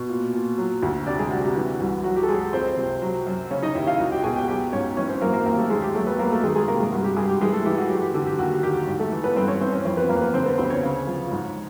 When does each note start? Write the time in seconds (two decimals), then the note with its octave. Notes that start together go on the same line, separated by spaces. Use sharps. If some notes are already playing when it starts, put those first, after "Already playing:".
Already playing: B2
0.09 A#2
0.34 A#2
0.58 F#3
0.82 D2
1.07 C3 D4 D5
1.19 G#3 G#4
1.31 C3 F#4
1.43 G4
1.55 E3 F#4
1.80 C2
2.04 F#3 F#4
2.16 G4
2.23 A4
2.29 F#3 G#3 G#4
2.53 C#2 C4 C5
2.77 C3
3.02 F#3
3.27 F#2
3.51 C#3 C#4 C#5
3.63 D#4 D#5
3.75 D#2 E4 E5
3.87 F4 F5
3.99 C#2 F#4 F#5
4.11 G4 G5
4.24 B2 G#4 G#5
4.36 G4 G5
4.48 F#3 G4 G5
4.73 G#2 C#4 C#5
4.97 E3 C#4 C#5
5.09 C4 C5
5.21 F#2 A#3 A#4
5.33 A#3 A#4
5.46 D#2 A#3 A#4
5.58 A3 A4
5.70 D#2 G#3 G#4
5.82 G4
5.94 F#3 A3 A4
6.07 B3 B4
6.19 F#3 A#3 A#4
6.31 A3 A4
6.43 D#3 G#3 G#4
6.55 G#3 G#4
6.68 C3 A#3 A#4
6.80 G#3 G#4
6.92 G2 F#4
7.04 G4
7.16 G2 G#3 G#4
7.29 G4
7.41 E3 G#3 G#4
7.53 A3 A4
7.65 E3 G4
7.78 F#4
7.89 F#2 G4
8.02 G4
8.14 D3 G4
8.27 G4
8.39 D#2 F#4
8.63 D#3 G4
8.88 G#2
8.99 A3 A4
9.12 E3
9.24 B3 B4
9.36 G2 C4 C5
9.48 C#4 C#5
9.61 E3 C4 C5
9.73 C#4 C#5
9.85 F2 C4 C5
9.97 B3 B4
10.09 F2 A#3 A#4
10.21 B3 B4
10.34 D3 C4 C5
10.46 B3 B4
10.58 D2 C4 C5
10.70 C#4 C#5
10.83 C#3
11.07 F3
11.31 G#2